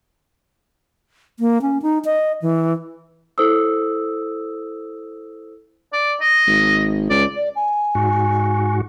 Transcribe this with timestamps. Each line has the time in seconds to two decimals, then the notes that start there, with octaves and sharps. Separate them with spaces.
1.40 A#3
1.62 C#4
1.82 D#4
2.05 D#5
2.42 E3
3.38 E4 A4 C5 D#6 E6
5.93 D5
6.21 D#5
6.47 G#1
7.10 C#2 D5
7.36 D5
7.56 G#5
7.95 G#2 F#4